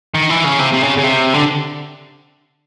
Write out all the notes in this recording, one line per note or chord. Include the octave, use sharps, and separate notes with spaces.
D#3
E3
C#3
C3
C3
C#3
C#3
C3
D3